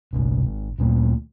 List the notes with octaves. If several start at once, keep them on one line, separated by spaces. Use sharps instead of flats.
G1 C2
G#1
D2 A#2